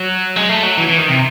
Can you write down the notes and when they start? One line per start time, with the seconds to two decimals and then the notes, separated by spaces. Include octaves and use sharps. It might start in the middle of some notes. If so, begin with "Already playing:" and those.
Already playing: F#3
0.36 G#3
0.49 A3
0.63 F#3
0.77 E3
0.88 E3
0.98 D#3
1.08 C3